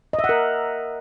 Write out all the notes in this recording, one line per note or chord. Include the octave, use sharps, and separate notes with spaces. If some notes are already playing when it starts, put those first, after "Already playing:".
D#5
E5
F#5
A#4